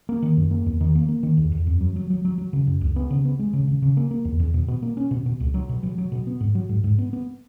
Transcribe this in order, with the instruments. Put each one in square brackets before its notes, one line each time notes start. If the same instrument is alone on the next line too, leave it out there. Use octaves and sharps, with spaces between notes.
[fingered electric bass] A#3
D#3
F#2
A#3
E2
D#3
A#3
A#3
D#3
E2
E2
F#2
F#3
F#3
F#3
F#3
F#3
C#3
F#2
C#2
B3
C#3
B3
G#3
C#3
C#3
C#3
A#3
A#3
E2
E2
B2
B2
A#3
C#4
B2
B2
C#2
F#3
B2
F#3
F#3
B2
B3
G#2
F#3
G#2
G#2
B3
B3